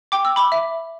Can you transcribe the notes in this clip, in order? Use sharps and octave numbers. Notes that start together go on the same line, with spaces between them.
G5 D6
E6
B5 D6
E5